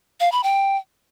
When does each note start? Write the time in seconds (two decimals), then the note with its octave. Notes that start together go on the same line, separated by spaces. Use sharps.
0.20 F5
0.32 B5
0.44 G5